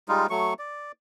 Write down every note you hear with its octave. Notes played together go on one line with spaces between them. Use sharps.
G3 G#3 D#4 F4
F#3 A3 C#6
D5